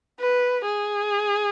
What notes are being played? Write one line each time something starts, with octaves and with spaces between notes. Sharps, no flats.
B4
G#4